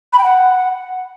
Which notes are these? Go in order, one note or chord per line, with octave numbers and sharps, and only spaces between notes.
B5
G5
F#5